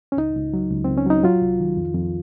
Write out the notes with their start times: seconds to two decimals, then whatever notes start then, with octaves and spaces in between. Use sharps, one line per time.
0.12 C#4
0.17 C#2 D#4
0.35 C#2
0.53 F#3
0.71 C#2
0.84 C#2 C4
0.97 C#4
1.06 F#3 D#4
1.24 F#3 F4
1.42 C2
1.60 D#3
1.77 F2
1.95 F2